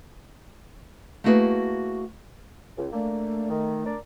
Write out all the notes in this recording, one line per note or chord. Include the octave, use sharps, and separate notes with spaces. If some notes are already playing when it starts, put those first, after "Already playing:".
A3 A#3 E4 F#4 G#4 B4
C#2
A3 A#3 D4
D#3
D4 A#4 D5